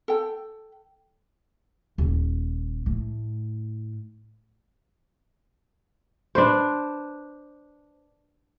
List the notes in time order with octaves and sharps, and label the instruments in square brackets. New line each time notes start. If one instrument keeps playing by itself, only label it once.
[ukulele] A4 G5
[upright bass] D#1
A2
[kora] D4 B4 C5